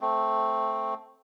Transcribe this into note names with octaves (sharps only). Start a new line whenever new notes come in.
A3 C4